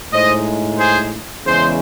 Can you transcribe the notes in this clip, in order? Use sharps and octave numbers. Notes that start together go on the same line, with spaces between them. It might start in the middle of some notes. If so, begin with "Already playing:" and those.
A2 G#3 D#4 C5 D#5
G#4 C5
E2 C#3 G#3 C#4 G#4 C5